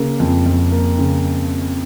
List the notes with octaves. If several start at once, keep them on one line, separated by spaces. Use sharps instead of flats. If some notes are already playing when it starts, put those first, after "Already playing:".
Already playing: C#3 A#3
F2
F2
A#3
C#3